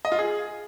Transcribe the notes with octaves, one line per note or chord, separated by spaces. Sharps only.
D#5
F4
G#4